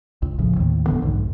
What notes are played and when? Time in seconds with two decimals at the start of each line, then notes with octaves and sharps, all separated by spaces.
0.22 C#2
0.38 A1 A2 C#3 F3
0.56 D#2 A2
0.86 E1 D3 E3 B3
1.02 B1 F2 G#2